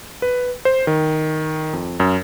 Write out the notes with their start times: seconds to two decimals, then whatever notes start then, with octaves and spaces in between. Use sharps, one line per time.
0.22 B4
0.65 C5
0.87 D#3
1.73 F2
2.00 F#2